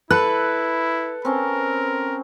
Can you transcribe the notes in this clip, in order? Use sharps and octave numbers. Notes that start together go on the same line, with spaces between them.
E4 A4 B4 F#6
C4 C#4 A#4 A5